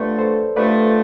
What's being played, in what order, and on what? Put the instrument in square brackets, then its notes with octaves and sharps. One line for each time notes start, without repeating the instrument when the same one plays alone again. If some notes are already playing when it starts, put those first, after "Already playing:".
Already playing: [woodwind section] G2 D3 F3 A3 [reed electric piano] B4 D5
[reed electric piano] A4 C5
[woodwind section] G2 D3 F3 A3 [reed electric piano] B4 D5